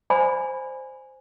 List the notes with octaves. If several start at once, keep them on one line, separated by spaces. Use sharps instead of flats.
C5 D5 G#5 B5